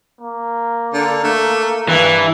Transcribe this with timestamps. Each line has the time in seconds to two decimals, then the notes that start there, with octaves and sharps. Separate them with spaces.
0.21 A#3
0.93 D3
1.24 A3
1.89 G2 E3